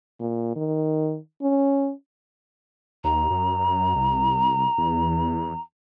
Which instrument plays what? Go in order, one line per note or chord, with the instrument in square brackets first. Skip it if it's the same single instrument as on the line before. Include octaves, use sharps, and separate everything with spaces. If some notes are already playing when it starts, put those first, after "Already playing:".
[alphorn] A#2
D#3
C#4
[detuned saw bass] D#2 [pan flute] A#5
[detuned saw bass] F#2
C2
E2